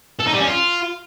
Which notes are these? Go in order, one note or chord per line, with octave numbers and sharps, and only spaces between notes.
A4
D#4
G3
C#4
F4